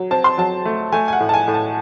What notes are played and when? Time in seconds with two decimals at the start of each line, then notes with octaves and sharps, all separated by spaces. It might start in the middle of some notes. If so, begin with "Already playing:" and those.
Already playing: F#3
0.11 C4 A5
0.24 C6
0.38 F#3 A5
0.65 A3
0.92 A3 G#5
1.08 G#5
1.13 F#5
1.20 A2
1.29 A5
1.34 G#5
1.48 A2
1.54 A5